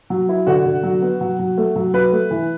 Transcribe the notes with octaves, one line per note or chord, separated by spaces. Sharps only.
F#3
E4
D3 F#4 F#5
D3
F#3
B3
F#3
F#3
A3
F#3
F#3 B4
A3
E3